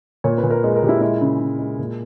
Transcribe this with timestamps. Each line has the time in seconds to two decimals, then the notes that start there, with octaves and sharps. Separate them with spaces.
0.24 A#2 C#5
0.38 B4
0.43 A#2
0.50 A#4
0.64 G#3
0.76 A#4
0.83 A#2 G4
0.89 E4
1.01 G#3 E4
1.21 C#3
1.40 C#3
1.59 G#3
1.79 A#2